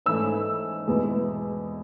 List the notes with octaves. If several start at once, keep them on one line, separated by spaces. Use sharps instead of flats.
G#2 E3 A3 C#4 E6
E2 B2 G#3